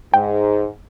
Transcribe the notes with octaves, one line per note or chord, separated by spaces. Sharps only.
G#2 G5